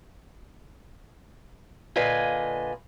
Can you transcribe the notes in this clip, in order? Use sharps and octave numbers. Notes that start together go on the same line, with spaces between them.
A#2 D3 B4 D#5 F5 G#5